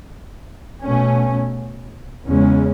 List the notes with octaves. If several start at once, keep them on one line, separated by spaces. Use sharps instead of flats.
B2 A3 C#4
E2 C#3 G#3 C#4